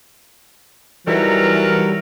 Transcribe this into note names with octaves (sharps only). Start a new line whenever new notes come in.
E3 F#3 G3 D#4 E4 A4 A#4